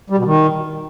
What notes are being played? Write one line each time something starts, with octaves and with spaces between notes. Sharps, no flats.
G3
B2
D#3